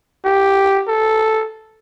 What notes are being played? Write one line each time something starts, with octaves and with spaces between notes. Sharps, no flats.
G4
A4